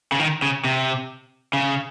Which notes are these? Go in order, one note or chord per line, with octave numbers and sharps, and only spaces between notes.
C#3
D#3
C#3
C3
C#3